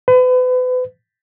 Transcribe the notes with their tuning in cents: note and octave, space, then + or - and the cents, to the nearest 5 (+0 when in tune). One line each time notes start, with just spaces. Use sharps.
B4 +35